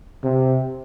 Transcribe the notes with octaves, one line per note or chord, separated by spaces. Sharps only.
C3